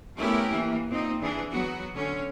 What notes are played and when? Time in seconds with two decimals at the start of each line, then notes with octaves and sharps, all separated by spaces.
0.17 A3 B3 C#4 E4 G4 A#4
0.52 E3 A#3
0.89 A#2 C4 D#4
1.21 E3 D4 G#4
1.51 F#3 B3 F#4
1.94 D3 C#4